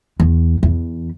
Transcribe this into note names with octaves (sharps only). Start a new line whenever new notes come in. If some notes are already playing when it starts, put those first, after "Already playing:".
E2
E2